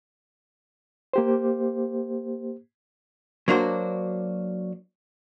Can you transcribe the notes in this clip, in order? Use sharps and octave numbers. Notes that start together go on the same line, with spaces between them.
A#3 G4 C5
F#3 A#3 D4 F#4 C5